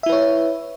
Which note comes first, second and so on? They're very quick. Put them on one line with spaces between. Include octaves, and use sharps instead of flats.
E5 E4 B4 C#5